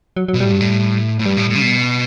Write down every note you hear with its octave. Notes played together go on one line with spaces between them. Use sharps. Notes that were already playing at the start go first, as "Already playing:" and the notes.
F#3
F#3
B2
A2 G3
G2
A2
A2
G2 G3
A2
A2
C#3
B2